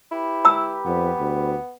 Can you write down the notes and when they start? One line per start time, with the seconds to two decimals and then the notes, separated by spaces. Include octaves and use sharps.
0.11 E4 G4 B4
0.45 A#5 E6
0.86 F2 B3
1.20 D2